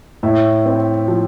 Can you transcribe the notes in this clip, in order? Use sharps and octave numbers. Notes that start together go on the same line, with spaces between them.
A2 E5
C4
F3